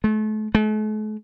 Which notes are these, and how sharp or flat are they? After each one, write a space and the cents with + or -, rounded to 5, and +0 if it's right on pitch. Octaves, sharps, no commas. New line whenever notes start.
A3 -35
A3 -45